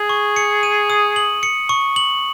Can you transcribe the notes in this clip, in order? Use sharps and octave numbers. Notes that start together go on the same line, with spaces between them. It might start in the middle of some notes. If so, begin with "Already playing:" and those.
Already playing: G#4
C#6
C#7
D#7
D#6
F#7
C#7
C#6
F#7